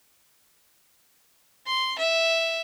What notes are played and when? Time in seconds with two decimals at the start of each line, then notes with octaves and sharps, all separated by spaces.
1.67 C6
1.99 E5